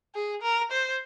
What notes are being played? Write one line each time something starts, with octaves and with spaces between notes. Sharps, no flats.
G#4
A#4
C5